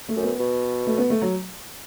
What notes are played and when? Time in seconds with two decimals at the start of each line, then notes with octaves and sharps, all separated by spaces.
0.09 A3
0.16 F#2
0.23 B3
0.39 B2
0.87 A3
0.98 B3
1.10 A3
1.22 F#3